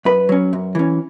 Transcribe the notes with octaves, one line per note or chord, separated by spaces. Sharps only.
F#2 B4 B5
F#3 C#4
F#2
E3 C#4